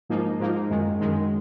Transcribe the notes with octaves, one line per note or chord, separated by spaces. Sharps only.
G#2 F3 A#3 D#4
G#2 F3 A#3 D#4
F#2 D#3 G#3
F#2 D#3 G#3